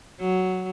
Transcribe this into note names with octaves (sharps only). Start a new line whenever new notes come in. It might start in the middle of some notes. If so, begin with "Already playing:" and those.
F#3